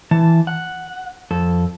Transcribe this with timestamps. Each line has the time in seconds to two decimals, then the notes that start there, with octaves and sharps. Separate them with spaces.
0.11 E3 A5
0.47 F#5
1.31 F2 A4